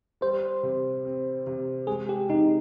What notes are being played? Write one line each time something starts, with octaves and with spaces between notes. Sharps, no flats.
G3 C5
C3
C4
C3
G#3 G#4
G4
C3 D#4